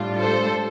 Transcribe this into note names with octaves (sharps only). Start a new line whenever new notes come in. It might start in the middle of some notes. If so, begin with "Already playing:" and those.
Already playing: A2 G3 D4 F4
A4 C5